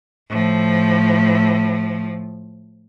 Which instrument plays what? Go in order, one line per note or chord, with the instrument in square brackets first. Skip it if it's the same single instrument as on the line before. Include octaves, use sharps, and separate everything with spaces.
[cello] A2 F3